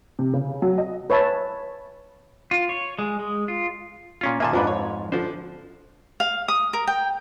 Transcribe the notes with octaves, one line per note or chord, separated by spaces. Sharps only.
C3
C#3
F#3
D#5
B4 C#5 E5 A5
F4
C#5
G#3
G#3
F4
A#2 C#4 F4
A#2 D#3 A#3 E5 G#5 A5
F2 G#2 F3 D4 B4
C#5
D3 F3 C5
F5
D#6
A#4
G5